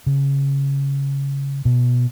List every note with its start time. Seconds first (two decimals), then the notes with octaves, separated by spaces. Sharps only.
0.06 C#3
1.65 B2